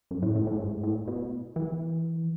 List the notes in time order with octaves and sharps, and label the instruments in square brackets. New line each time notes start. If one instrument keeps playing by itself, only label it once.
[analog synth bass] F#2
A2
A2
A2
G#2
A2
B2
E3